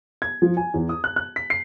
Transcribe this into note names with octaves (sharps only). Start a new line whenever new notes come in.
G#6
F3
G#5
E2
D#6
F#6
F#6
B6
C7